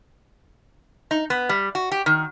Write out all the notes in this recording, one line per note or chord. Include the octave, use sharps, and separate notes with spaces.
D#4
B3
G3
F#4
G4
D#3